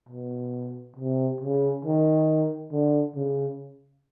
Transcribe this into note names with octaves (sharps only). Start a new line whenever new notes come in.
B2
C3
C#3
D#3
D3
C#3